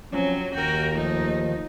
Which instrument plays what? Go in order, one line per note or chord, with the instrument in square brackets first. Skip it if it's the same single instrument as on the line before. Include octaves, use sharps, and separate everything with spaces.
[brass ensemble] F3 C4 C#4 [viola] F#3
[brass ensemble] D#2 [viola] F#4 A#4 [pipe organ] G5
[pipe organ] D#3 F3 [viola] A3 D#4